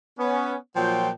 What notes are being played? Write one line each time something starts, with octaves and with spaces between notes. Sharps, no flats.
B3 C#4
A#2 F3 F#3 G5